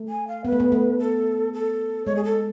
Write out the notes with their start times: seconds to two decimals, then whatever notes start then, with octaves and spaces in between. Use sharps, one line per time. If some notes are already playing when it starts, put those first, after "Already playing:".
Already playing: A3
0.09 G#5
0.28 F5
0.45 B3 B4
0.52 A3
0.60 B3
0.72 A3
0.99 A4
1.53 A4
2.06 G#3 C#5
2.16 G#4
2.24 A4